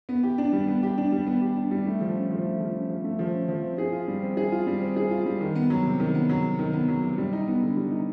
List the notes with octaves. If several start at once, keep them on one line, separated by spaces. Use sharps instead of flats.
B3
G4
D4
G3
B3
G4
D4
G3
B3
G4
D4
G3
A3
F3
C#4
F3
A3
F3
C#4
F3
A3
F3
C#4
F3
C4
G#4
F4
G3
C4
G#4
F4
G3
C4
G#4
F4
G3
D#3
B3
F#3
C3
D#3
B3
F#3
C3
D#3
B3
F#3
C3
G3
D#4
B3
D3
G3
D#4